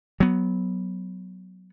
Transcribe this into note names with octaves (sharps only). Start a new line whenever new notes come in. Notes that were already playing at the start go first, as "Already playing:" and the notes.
F#3 B3